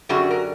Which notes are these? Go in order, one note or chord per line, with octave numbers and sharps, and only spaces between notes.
F#2 D3 G3 F#4 G#4
A#4